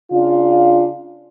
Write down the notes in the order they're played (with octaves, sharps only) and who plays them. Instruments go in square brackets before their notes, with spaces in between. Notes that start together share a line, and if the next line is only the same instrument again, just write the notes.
[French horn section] C#3 D4 F4